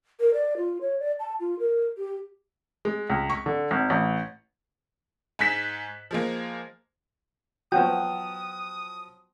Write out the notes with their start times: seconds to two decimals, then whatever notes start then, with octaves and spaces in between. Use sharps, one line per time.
0.20 A#4
0.34 D5
0.57 F4
0.81 C#5
1.00 D5
1.20 A5
1.40 F4
1.59 A#4
1.98 G4
2.85 G#3
3.10 C#2
3.30 C#6
3.46 D3
3.71 G#1
3.90 A1
5.39 G#2 G#5 F#6 B6 E7
6.11 F3 G#3 A#3
7.72 F3 F#3 B3 F#4 G5 D#6